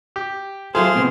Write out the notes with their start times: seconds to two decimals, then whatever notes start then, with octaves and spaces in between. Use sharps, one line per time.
0.16 G4
0.75 F#3 F4 G#4 A4 C5 E5 C6 F6
0.95 A2 C3 B3